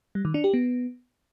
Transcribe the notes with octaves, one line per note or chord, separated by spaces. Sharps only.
G3
D#3
D4
G4
B3